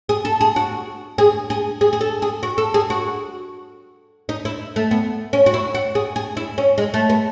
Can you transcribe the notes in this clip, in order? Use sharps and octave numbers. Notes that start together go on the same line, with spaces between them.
G#4
A4
G#4
F#4
G#4
G#4
G#4
G#4
A4
G#4
F#4
A4
G#4
F#4
D#4
E4
A3
B3
C#4
F#4
E4
F#4
G#4
G#4
E4
C#4
G#3
A3
B3